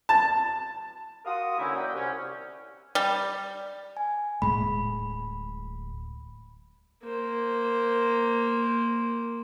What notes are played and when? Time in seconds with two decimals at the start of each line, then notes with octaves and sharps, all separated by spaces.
0.09 A5
1.25 F#4 A#4 F5 C6 D#6
1.58 D3 E3 A#3 C#4 D#4 E4
1.75 D5 F#5 G5
1.93 C2 C#4
2.95 G3
3.97 G#5
4.42 D1 A2 G#3 B5
7.03 A#3 C5